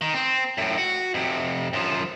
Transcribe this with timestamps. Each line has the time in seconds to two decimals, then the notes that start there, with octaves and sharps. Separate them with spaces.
0.01 D#3
0.14 C4
0.58 F#2 A2
0.78 F#4
1.14 F2 C3
1.73 F#2 F3